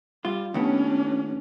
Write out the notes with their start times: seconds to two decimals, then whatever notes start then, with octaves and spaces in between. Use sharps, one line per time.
0.25 G3 F4
0.54 D#2 A2 B3 C#4 D4